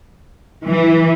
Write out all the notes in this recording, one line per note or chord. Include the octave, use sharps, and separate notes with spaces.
E3